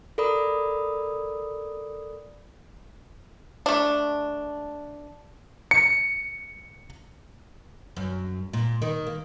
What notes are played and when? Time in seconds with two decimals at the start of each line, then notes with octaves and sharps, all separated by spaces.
0.18 A4 A#4 D5 B5 D#6
3.66 A3 D4
5.71 C#7
7.97 F#2
8.53 A#2
8.82 D#3
9.07 A#3